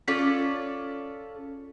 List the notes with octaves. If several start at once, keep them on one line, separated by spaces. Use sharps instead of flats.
C#4 F4 A4 D5